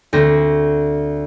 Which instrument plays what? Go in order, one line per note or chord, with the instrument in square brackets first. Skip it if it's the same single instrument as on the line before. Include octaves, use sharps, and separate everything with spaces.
[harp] D2 C4 A#6